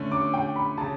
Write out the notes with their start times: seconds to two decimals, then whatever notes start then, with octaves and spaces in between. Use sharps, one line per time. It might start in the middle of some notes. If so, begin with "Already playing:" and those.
Already playing: D3 A3 C#4
0.11 D6
0.34 G5
0.56 B5
0.78 C#3 A5